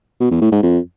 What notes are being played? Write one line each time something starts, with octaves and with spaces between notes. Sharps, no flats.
B2
E2
A2
G#2
F2